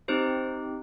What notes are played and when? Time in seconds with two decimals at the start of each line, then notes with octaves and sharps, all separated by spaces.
0.08 C4 D#4 G4 C5